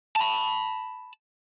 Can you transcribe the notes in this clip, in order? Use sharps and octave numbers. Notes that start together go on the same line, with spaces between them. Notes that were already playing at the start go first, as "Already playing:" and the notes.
A5 B5